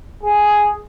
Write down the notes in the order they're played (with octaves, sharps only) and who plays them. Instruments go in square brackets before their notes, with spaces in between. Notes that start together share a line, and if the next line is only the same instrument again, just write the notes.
[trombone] G#4